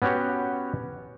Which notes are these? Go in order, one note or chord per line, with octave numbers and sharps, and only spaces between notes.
B3 C#4 F#4 G4 C#5